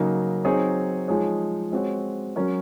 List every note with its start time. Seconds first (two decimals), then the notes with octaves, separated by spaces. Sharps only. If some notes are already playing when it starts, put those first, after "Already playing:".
Already playing: C#3 F#3 A#3 D#4
0.45 F#3 C4 D#4 G#4 C#5
1.08 F3 G#3 D#4 G#4 C#5
1.71 G#3 C4 F#4 C#5
2.36 F#3 C#4 F#4 A#4 C#5